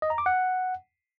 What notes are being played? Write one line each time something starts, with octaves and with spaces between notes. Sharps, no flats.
D#5
A#5
D6
F#5